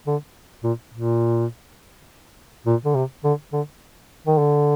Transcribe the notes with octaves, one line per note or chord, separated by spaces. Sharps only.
D3
A#2
A#2
A#2
D3
C3
D3
D3
D#3
D3